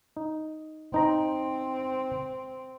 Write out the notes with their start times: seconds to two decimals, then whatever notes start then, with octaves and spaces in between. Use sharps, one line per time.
0.17 D#4
0.94 C4 D#4 A#5